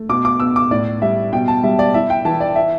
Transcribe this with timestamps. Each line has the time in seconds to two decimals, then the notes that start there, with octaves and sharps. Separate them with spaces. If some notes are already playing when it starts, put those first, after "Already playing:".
Already playing: A3
0.09 B2 D6
0.25 D6
0.40 B3 E6
0.56 D6
0.71 A2 D5
1.02 G3 E5
1.33 B2 G5
1.48 A5
1.63 G3 E5
1.79 D5
1.94 E4 E5
2.10 G5
2.25 E3 A5
2.40 D5
2.56 E5